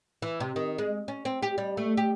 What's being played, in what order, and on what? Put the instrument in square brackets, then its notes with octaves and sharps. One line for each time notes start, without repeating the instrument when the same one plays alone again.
[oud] E3
C3
D#3
G#3
C#4
C4
G4
G3
A3
G4